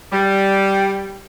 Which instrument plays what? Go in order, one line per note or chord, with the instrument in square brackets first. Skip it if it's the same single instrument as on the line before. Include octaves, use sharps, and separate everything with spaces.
[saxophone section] G3